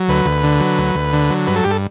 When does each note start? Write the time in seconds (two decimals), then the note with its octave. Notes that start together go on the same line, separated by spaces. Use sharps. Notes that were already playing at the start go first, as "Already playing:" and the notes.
Already playing: F#3
0.08 D2 B4
0.25 D2
0.44 D3
0.60 F#3
0.78 D2
0.95 D2
1.13 D3
1.30 F#3
1.47 G2 B4
1.56 A4
1.64 G2 G4
1.71 A4